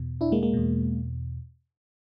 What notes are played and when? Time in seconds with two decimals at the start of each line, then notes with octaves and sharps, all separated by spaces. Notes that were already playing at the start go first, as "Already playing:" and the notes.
Already playing: E2 B2
0.21 D4 E4
0.32 G#3 A#3
0.43 G#3 A#3
0.53 E2 B2